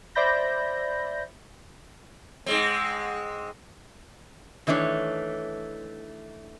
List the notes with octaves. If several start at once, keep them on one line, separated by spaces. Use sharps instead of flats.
C5 D5 E5 B5 G6 A#6
G#2 G#3 C4
D#3 E3 A3 D4 C#5